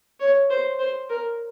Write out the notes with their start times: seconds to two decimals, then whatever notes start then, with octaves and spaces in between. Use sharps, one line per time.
0.20 C#5
0.50 C5
0.79 C5
1.09 A#4